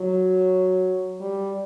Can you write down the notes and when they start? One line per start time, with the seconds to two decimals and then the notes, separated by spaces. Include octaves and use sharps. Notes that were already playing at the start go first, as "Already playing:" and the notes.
Already playing: F#3
1.21 G3